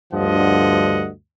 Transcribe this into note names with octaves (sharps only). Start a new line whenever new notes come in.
D2 G2 D3 F3 D#5 F#5